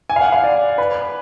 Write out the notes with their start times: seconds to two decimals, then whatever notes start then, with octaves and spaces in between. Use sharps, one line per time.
0.10 G#5
0.16 F5
0.21 F#5
0.32 F5
0.44 D5
0.78 B4